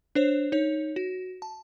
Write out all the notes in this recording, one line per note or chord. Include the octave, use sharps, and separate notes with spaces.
D4 C5 C#5
D#4 C#5
F#4
A5